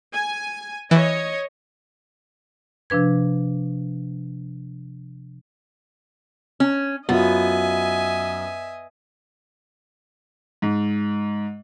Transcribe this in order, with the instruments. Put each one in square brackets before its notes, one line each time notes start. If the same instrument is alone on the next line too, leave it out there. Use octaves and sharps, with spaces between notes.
[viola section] G#5
[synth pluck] E3 [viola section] C#5 D#5
[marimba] C3 F3 D4 B4 G#6
[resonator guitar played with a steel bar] C#4
[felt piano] F#2 F4 [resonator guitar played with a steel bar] B3 [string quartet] D#5 E5 G#5
[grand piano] G#2